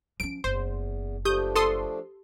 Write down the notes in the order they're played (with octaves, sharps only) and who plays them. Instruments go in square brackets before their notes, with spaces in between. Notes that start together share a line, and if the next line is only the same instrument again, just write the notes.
[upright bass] F3 C#4 [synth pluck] D7
[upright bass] F#1 [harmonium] E2 [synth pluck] C5
[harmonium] F3 A3 D4 [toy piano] G4 [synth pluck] D#6 G6
[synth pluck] A4 C6 D#6